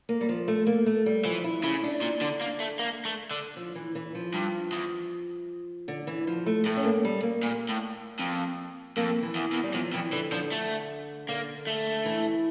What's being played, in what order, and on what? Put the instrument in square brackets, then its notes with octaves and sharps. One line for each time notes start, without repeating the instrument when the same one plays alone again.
[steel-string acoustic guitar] A#3
G3
F3
A3
A#3
A3
G3
[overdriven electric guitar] E3 [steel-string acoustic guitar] F3
[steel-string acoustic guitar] E4
[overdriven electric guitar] C#3 [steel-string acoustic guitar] E4
[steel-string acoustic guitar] D4
[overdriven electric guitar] A#2
D3
A#3
A3
A#3
A3
D3
[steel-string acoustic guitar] F3
E3
E3
F3
[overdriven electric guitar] G2
E2
[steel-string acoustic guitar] D3
E3
F3
A3
[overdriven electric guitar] A2 [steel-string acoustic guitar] A3
[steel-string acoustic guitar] C#4
A#3
G3
A#3
[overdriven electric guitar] A#2
A2
F2
[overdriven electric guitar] F2 [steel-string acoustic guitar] A#3
[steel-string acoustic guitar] E3
[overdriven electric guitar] E2
E2
[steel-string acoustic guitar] G3
[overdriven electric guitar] E2 [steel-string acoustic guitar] F3
[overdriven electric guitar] F2 [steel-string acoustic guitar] E3
[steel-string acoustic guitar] D3 [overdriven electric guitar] E3
[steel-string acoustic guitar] D3 [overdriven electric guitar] F3
[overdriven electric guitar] A3
[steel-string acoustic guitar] D3 [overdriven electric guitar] A#3
[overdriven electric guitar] A3
[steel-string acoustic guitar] E3